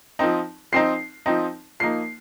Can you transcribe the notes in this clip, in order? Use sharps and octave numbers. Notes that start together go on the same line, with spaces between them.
F3 C4 D#4
F3 C4 D#4 C7
F3 C4 D#4
F3 A#3 D#4 C7